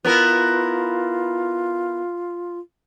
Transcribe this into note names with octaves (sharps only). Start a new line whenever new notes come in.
B3 E4 F4 A#4